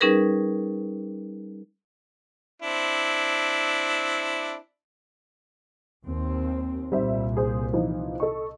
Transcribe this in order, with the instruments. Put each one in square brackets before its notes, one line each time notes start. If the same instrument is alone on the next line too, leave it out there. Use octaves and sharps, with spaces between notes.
[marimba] G3 C#4 D#4 G#4 A#4 B4
[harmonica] C4 D4 E4
[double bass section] D#2 C4
[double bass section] C2 A#2 [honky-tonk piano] G3 C4 E5
[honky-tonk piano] G#4 C5
E3 F3 D#4
A4 D#5 C#6